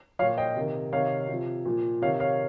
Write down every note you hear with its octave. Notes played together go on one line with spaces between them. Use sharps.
A#2 F3 C#5 F5
D#5 G5
C3 D#3
C3 D#3 C#5 F5
C3 F3
A#2 F3
C3 D#3 C#5 F5
C#5 F5